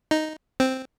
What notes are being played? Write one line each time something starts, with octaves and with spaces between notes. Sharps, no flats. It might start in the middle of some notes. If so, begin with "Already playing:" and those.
D#4
C4